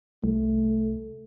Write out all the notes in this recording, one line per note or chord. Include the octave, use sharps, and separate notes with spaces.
C2 A3